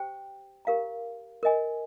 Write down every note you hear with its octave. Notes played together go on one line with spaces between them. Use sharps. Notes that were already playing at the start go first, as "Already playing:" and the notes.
Already playing: G4 C5 G5
G4 A#4 F5 A#5
A#4 D#5 G#5